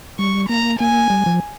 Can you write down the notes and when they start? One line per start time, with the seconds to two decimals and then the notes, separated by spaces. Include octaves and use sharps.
0.19 G3 C#6
0.49 A#3 A#5
0.80 A#3 G#5
1.10 G3
1.26 F3